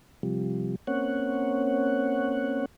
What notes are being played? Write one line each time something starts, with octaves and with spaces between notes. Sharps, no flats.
C3 F3 G3
A#3 C4 C#4 C#5 F#5